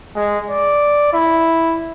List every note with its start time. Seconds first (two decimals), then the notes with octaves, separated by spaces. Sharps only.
0.16 G#3
0.50 D5
1.13 E4